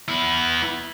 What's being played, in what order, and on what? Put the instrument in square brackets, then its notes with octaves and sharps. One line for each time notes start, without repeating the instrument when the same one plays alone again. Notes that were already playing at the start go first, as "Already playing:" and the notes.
[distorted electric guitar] B3 E4